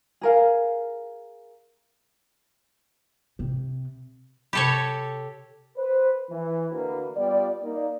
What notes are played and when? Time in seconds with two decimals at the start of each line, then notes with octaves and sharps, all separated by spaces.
0.21 G#4 A#4 F5
3.39 C3
4.53 C3 G4 A4 C#5 B5
5.77 B4 C5
6.30 E3
6.71 D2 D3 A#3 F#4 B4
7.16 G3 B3 F4 D5
7.63 A#3 D#4 D5